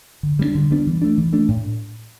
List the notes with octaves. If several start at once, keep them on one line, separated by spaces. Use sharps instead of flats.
D3
G3 B3 D4
D3
G3 B3 D4
E3
A3 D4
E3
A3 D4
A2